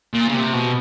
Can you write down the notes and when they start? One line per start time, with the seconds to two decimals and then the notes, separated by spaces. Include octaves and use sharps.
0.14 A#2
0.29 C#3
0.34 C3
0.54 B2